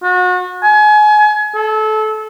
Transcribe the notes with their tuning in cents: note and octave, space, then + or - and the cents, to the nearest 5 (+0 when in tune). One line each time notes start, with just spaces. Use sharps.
F#4 -35
G#5 +30
A4 -25